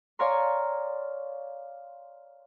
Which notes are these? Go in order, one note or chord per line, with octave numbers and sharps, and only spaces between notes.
C#5 D5 F5 G#5 A#5 C6